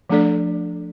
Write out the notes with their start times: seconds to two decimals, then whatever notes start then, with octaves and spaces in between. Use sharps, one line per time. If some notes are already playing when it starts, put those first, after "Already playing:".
0.10 F3 A3 D4 A4 D5